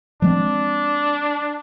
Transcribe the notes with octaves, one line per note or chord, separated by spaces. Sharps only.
F3 G#3 C4 D4